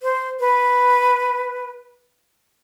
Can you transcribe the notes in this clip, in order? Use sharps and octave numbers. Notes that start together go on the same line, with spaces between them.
C5
B4